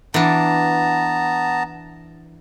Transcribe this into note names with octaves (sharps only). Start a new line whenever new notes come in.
E3 B3 D4 A5 A#5